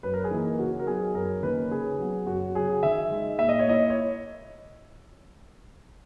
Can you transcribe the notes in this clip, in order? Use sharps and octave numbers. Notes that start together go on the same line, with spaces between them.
F#2 B4
A#4
G#4
E3 A#3 D#4 A#4
C#3 F#4
A#4
F#3 B3 D#4 G#4
F#2 A#4
D#3 A#3 C#4 B4
C#3 G#4
F#3 B3
F#2 F#4
C#3 F#3 G#4
D#3 E5
G#3 D#4
A#2 E5
D#5
C#5
A#3 E4 D#5
C#5